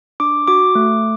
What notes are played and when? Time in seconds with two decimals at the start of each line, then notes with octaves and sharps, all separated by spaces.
0.20 D4 D6
0.47 F#4 D6
0.75 A3